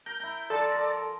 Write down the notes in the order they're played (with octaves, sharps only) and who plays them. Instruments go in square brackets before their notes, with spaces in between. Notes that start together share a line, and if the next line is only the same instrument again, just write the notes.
[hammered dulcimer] A#4 [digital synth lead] G6
[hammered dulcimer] E4 A#5
[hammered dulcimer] F3 [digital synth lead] A4 [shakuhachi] D5
[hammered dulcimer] A#4